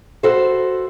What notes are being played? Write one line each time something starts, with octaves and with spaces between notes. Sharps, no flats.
F#4 A4 B4 C5 E5